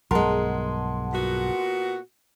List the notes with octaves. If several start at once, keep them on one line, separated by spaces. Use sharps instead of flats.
B1 G2 B2 G#3 A#4 F#5 A5 C6
A#2 B3 F#4